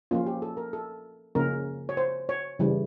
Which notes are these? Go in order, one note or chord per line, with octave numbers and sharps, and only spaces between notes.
F3 A#3 C#4 F4
G4
A4
A#4
A4
C#3 F3 A#3 C#4 A#4
C#5
C5
C#5
C#3 E3 G3